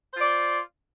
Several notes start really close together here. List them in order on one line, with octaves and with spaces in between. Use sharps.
C5 F4 D5